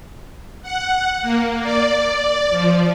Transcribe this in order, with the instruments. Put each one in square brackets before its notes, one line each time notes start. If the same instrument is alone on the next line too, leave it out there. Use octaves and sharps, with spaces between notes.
[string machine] F#5
A#3
D5
F3